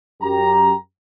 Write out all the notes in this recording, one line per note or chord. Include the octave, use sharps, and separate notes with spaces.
F#2 G4 A#5